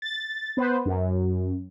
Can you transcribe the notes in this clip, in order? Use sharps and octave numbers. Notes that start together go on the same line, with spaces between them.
A6
B3 B4 C5
F#2